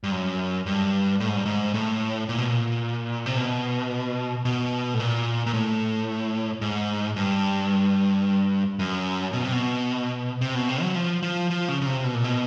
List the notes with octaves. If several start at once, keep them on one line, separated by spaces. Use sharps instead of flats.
G2
F#2
G2
A2
G#2
G2
G#2
A2
A#2
B2
A#2
C3
B2
B2
A2
A#2
A#2
A2
G#2
G2
F#2
B2
C3
B2
C3
B2
C3
F#3
F3
F3
F3
C#3
C#3
C3
B2
A#2
B2